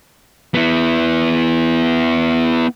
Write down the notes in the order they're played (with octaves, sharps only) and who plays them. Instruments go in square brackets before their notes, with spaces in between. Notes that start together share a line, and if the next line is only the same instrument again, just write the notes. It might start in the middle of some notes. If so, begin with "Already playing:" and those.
[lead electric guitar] B3 E4